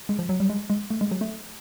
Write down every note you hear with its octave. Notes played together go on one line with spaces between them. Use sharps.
G#3
F3
F#3
G3
G#3
G#3
A3
G#3
F#3
A3